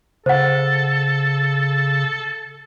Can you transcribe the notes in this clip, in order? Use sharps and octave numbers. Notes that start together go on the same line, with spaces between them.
C#3 A4 C5 F#5